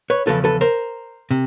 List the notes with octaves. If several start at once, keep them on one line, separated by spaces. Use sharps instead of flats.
B4 C#5
E2 C#3 F3 A4 B4
A4 B4
A#4 C5
C3